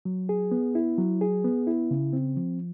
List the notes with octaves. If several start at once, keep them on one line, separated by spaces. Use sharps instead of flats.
F#3
G#4
B3
E4
F#3
G#4
B3
E4
C#3
C4
F3